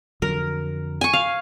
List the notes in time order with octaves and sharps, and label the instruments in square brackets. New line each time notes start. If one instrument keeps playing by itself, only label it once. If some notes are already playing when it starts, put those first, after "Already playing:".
[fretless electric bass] F2 D3 F#3 [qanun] A#4
[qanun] G#5 C#6
F5